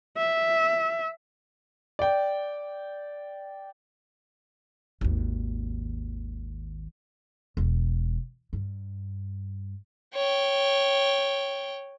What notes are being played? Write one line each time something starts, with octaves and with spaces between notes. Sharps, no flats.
E5
D5 G5
G#1 D#2
E1
G2
C#5 G5